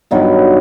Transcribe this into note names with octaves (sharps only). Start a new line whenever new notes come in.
G2 D#3 F#3 B3